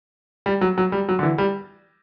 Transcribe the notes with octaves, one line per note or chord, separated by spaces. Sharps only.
G3
F#3
F#3
G3
F#3
D3
E3
G3